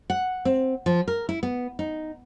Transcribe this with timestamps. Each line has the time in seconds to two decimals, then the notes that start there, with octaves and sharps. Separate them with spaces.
0.10 F#5
0.45 C4
0.86 F3
1.08 A#4
1.29 E4
1.43 B3
1.79 D#4